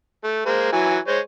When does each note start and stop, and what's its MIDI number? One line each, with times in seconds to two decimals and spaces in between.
0.24 0.43 57
0.46 0.68 56
0.46 0.68 58
0.46 0.68 72
0.73 0.97 52
0.73 0.97 54
0.73 0.97 80
1.08 1.19 56
1.08 1.19 72
1.08 1.19 73